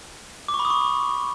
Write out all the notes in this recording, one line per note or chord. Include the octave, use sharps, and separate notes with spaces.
D6
C#6
B5
D#6
C#6